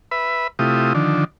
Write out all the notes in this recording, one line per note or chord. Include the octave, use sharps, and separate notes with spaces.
B4 E5 B5
C3 A3 E4 F4 G4 D#6
D3 D#3 F3 D4